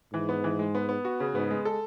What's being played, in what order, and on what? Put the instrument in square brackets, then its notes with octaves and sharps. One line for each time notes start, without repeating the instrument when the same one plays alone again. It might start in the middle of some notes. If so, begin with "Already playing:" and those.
[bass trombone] G#2 [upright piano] E3
[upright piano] B3
E3
G#3
B3
B3
F#4
C#3
[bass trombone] G#2 [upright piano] B3
[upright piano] G#3
A4